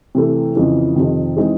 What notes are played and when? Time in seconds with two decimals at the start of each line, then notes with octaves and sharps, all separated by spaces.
0.15 C3 E3 A3
0.56 F2 C#3 E3
0.96 F2 C3 D#3
1.37 E3 G#3 C4 D#4